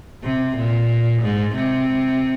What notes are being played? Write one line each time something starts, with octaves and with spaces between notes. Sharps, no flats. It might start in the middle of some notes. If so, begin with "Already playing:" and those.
C3
A#2
G#2
C3